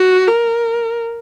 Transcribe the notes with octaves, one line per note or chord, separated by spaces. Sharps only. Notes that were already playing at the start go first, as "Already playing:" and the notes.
Already playing: F#4
A#4